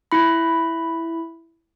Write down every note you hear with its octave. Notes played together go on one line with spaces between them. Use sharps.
E4 B5